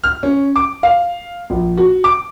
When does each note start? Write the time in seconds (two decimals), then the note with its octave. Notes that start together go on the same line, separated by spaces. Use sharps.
0.04 F6
0.23 C#4
0.56 D6
0.83 F5
1.50 A#1
1.77 F#4
2.04 D6